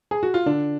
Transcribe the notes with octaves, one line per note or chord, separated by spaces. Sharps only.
G#4
F#4
F4
D3 D4